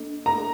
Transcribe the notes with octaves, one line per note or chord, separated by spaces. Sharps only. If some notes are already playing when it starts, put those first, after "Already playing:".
Already playing: A#3 D4 A4 D#5
A#5